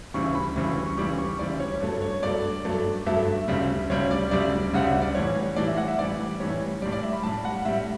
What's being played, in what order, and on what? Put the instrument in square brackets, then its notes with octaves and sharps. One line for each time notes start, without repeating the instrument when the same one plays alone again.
[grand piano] D2 C#3 E3 G3 C#6
B5
D2 C#3 E3 G3 C#6
C#6
D2 C#3 E3 G3 D6
C#6
D2 C#3 E3 G3 D5
C#5
G2 F#3 A3 C#5
C#5
G2 F#3 A3 D5
G2 F#3 A3
G2 F#3 A3 E5
D2 C#3 G3
D2 C#3 G3 C#5
D5
D2 C#3 G3 D5
D2 C#3 G3 F#5
E5
D5
A2 E3 G3 C#5
A2 E3 G3 D5
E5
F#5
E5
A2 E3 G3 D5
A2 E3 G3 C#5
G3 D5
A2
D5
E5
B5
A2 G3 A5
F#5
A2 G3 E5